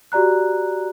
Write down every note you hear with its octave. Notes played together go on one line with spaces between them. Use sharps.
F#4 G4 D5 A#5 F#6